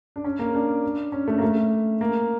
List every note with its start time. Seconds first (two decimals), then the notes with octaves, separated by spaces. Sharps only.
0.16 D4
0.24 C#4
0.39 A#3
0.55 D4
1.12 C#4
1.28 A3
1.38 A#3
1.42 A3
2.01 A#3